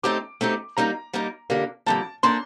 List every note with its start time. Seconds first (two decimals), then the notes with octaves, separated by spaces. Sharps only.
0.03 A3 C4 D#4 G4 D6
0.41 A3 C4 D#4 G4
0.77 G3 A#3 D#4 A#5
1.13 G3 A#3 D#4
1.50 F2 D3 G3 A#3
1.86 F2 D3 G3 A#3 A5
2.23 A#3 D4 A4 C5 C6